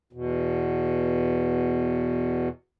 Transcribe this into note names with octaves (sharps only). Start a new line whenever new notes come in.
E2 B2